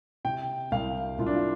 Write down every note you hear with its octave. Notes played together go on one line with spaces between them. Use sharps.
C3 G5
C2 F5
C2 F4
D4
F4